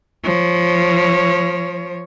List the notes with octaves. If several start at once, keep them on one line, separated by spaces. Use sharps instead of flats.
F3 C#5